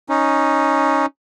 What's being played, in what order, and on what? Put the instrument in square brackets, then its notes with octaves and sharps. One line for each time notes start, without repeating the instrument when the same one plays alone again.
[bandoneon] C#4 D#4